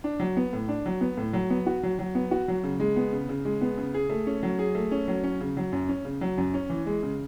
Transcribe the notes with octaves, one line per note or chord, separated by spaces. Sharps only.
D4
F#3
B3
A2
D4
F#3
B3
A2
F#3
B3
F#4
F#3
F#3
B3
F#4
F#3
C#3
G#3
B3
C#3
C#3
G#3
B3
C#3
G#4
A3
C#4
F#3
G#4
A3
C#4
F#3
C#4
C#3
F#3
F#2
C#4
C#3
F#3
F#2
C#4
E3
G#3
C#3